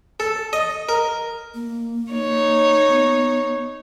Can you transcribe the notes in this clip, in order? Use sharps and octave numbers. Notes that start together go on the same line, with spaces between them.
A4
D#5
A#4
A#3
D#4 C#5
B3